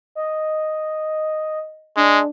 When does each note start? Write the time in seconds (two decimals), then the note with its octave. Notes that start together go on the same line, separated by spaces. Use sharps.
0.15 D#5
1.97 G#3 D4